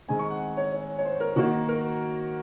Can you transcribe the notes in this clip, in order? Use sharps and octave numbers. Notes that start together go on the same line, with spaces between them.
D#3 G#3 C4 G#5
C#6
F#5
C#5
C#5
C#5
C5
A#4
D#3 A#3 F#4
A#4